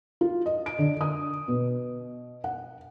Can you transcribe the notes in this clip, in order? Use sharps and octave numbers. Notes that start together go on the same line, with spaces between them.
F4
D#5
D7
D3
D#6
B2
F#5